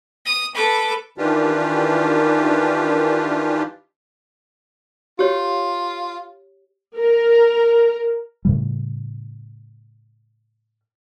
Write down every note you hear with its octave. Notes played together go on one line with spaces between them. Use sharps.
D#6
A4 B4 D6
D#3 E3 D4 F4 G4
F4 G4 C#5
A#4
A2 C#3 G3